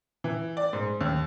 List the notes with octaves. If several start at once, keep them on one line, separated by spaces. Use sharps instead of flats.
E3
D5
G#2
D#2